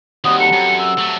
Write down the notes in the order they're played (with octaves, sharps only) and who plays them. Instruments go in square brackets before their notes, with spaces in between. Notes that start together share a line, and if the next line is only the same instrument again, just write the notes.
[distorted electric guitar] D#2 [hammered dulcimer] G3 C4 F#4 [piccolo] D#6
[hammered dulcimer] A4 A#5 [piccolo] C#7
[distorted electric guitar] F#2
[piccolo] E6
[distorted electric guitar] F#3 A3